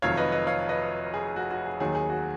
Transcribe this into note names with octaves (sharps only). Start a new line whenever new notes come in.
F1 F2 D#3 F#3 C#5 F5
B4 D#5
B4 D#5
C#5 F5
B4 D#5
G#4
F#4
F#4
G#4
D#2 D#3 F#3 G#4
G#4
F#4